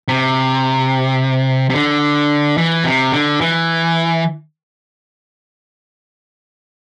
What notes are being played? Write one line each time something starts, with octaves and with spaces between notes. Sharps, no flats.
C3
C3
D3
E3
C3
D3
E3